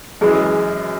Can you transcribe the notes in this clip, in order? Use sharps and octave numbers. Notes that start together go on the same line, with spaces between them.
F#2 E3 G#3 G#4